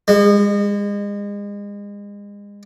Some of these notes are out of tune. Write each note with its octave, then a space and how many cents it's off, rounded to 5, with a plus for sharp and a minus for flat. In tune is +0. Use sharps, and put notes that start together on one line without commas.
G#3 -35